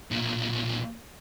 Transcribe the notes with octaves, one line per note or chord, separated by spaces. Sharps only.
B1 A#2